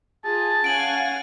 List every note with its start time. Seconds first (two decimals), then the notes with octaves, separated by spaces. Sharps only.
0.25 F4 G#4 A5
0.64 C#4 F5 F#5 G#5 D7 F#7